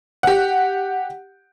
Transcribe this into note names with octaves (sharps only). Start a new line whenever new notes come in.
G4 F#5